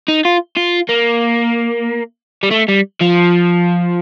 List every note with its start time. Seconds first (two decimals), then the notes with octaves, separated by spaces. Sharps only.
0.08 D#4
0.25 F4
0.56 F4
0.89 A#3
2.43 G3
2.51 A3
2.68 G3
3.01 F3